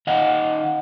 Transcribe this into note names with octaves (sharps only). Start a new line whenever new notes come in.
D#3 D#5 F5 F#5